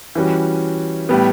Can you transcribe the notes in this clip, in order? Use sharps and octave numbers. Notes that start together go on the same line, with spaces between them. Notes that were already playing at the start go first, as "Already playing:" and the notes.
E3 G3 C#4 F#4
A2 G3 B3